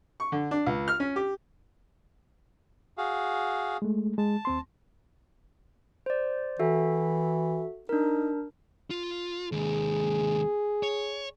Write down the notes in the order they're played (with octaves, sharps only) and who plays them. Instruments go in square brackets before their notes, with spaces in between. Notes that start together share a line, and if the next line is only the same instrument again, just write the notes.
[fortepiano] C#6
D3
D4
C#2
F6
C#4
G4
[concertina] F#4 G#4 F5
[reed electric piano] G#3 A3
[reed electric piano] G#3 [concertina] A5
[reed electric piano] D#2 C4 C6
[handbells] C5 D5
[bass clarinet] E3 [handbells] F#4 A4 E5
[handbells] D4 A#4 [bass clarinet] D#4
[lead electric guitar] F4
[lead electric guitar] D#2 G#3 [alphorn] G#4
[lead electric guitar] C#5